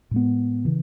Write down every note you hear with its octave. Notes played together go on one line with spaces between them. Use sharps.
A2 G#3 B3
C#3 E3